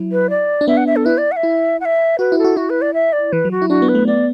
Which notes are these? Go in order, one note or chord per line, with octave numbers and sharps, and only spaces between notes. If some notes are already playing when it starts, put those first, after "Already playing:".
Already playing: F#3 E4
B4
D5
D4
B3 E5
F#5
E5
A4
E4 B4
D5
F#5
E5
E4
F#5
E5
F#4 B4
E4
A4
F#4
E4 F#4
B4
D5
E5
D5
E3 B4
F#3
F#4
E4
D4 F#4
B3
B4
A3
B3 D5